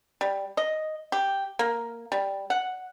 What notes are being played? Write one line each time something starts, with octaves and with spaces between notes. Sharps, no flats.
G3
D#5
G4
A#3
G3
F#5